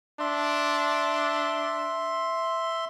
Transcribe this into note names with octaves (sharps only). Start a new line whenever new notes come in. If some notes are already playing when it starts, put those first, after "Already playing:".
D4 E5 C6